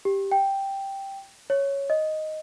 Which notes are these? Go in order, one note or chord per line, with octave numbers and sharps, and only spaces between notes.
G4
G5
C#5
D#5